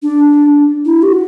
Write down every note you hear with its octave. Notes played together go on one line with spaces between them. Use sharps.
D4
E4
G4
F#4